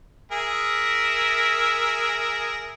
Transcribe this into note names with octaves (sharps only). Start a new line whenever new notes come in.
G#4 A#4 E5